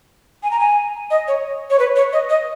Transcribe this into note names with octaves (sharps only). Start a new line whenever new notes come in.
G#5
A#5
G#5
D#5
C#5
C#5
B4
C#5
D#5
D#5